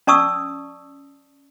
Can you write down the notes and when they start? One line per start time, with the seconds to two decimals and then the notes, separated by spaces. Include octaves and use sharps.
0.07 C#4 D5 A5 C#6 D#6 E6